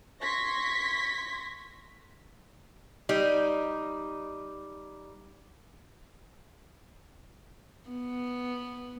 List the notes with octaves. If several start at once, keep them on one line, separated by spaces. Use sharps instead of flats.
C6 C#6 G#6 A#6 B6
G3 D#4
B3